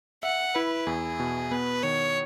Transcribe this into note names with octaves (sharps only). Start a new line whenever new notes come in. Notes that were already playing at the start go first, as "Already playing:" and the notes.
E5 F#5
E4 B4
E2 G#4
B2
B3 B4
D#3 C#5